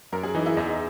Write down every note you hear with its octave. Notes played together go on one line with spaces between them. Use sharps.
F#2 A#4
G#4
E3 D#4
E4
E2 D#5